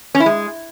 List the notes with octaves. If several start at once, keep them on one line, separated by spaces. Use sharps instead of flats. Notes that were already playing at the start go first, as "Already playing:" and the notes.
C#4
E4
G#3